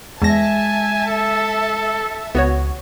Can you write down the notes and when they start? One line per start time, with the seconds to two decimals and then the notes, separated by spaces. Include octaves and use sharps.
0.22 E2 G#3 E5 G#5 A5 A#6
1.07 A4
2.35 C#2 B3 F#4 C#5